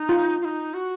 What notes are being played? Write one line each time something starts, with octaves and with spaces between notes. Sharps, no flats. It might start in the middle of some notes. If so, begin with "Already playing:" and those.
Already playing: D#4
F4
F4
D#4
F#4